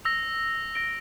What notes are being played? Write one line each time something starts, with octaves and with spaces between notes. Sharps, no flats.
E6 A#6 F7
E6 A#6 D7 G7